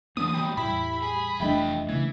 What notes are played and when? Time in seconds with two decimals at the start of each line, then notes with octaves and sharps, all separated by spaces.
0.17 D3 E3 G#3 A#3 B3 D#6
0.34 G#2 F#3 G3 G5 B5
0.57 E2 A2 G3 E4 B5 B6
1.02 G3 G#4
1.40 F1 E2 F3 A3 D4 D#5 E5 G5
1.89 C#3 E3 A3 A#3 G#6